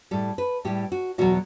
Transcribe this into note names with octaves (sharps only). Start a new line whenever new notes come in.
A2 G3 A4
B4
A2 G3 G4
F#4
E2 B2 F#3 F#4